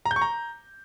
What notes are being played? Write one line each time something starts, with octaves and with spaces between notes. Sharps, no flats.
A#5
G6
C#6
A#5